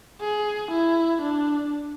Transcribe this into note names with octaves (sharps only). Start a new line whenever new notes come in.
G#4
E4
D4